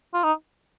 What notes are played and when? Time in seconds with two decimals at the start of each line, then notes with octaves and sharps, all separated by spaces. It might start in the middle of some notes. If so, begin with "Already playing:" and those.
0.14 F4
0.24 D#4